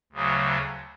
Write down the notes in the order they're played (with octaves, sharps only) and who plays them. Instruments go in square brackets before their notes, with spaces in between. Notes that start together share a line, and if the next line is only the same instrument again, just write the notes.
[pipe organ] D2 C#3 F#3